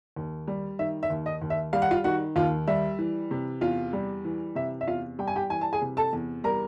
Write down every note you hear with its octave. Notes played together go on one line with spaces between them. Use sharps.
D#2
G3
D#3 E5
E5
D#2
D#5
D#2
E5
G3 F5
F#5
F4 F5
D#3 F#4 F#5
D#2 F4 F5
G3 E5
E3
C3
E2 F4 F5
G3
E3
C3 E5
E5
E2 F4 F5
G3 G5
G#5
G4 G5
E3 G#5
A5
G#4 G#5
C3
A4 A5
E2
G3 A#4 A#5